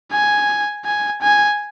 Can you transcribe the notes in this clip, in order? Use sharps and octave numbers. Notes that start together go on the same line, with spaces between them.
G#5
G#5
G#5